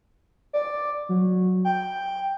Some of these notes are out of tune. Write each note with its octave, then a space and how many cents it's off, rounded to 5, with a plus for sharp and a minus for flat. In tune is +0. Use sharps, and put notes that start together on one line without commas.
D5 +5
F#3 -15
G5 +5